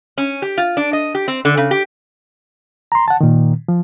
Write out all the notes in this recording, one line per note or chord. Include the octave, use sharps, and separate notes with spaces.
C#4
G4
F4
D4
D#5
G4
C4
D3
C#3
G4
A#5 C6
F#5 A5
A#2 D#3
F3